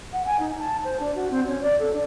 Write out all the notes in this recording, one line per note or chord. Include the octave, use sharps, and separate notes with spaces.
F#5
G#5
D#4
A5
C5
D4
F#4
C4
C#4
D5
A4
D4